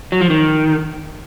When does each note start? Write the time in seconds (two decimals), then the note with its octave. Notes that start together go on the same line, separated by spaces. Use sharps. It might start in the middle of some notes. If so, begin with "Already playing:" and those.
0.12 F#3
0.21 F3
0.30 D#3